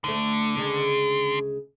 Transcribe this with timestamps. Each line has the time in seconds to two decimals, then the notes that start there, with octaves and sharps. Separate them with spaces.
0.04 D2 D3 A3
0.55 D2 C#3 G#3